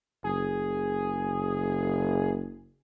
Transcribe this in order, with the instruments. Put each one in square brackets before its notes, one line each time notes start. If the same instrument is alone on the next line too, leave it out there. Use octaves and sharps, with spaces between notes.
[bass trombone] F#1 [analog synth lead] G#4